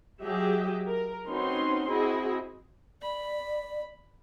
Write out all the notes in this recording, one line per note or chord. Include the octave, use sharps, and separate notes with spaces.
F#3 G4 G#4 D#5 E5
A#4
C4 C#4 D#4 F#4 B4 C6
C4 E4 F#4 G#4 D#5
D5 B5